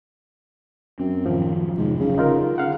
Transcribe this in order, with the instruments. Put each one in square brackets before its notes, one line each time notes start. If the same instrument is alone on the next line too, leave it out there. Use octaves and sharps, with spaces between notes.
[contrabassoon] F#2 [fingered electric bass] C4
[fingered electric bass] A2 D#3 [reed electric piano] F3
[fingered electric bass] F2 C3 [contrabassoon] G#2
[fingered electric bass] E1 F#3 [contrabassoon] C#3
[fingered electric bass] D3 [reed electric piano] D#4 F4 A#4
[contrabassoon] C#3 [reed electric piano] F5 F#5